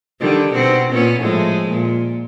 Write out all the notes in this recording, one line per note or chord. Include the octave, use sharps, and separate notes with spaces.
D3 D#3 G3
B2 C4 F#4
A#2 B3 C#4
A2 F3 G#3
A#2